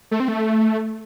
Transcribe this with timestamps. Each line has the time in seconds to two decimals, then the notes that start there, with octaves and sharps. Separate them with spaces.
0.11 A3
0.20 C4
0.28 A3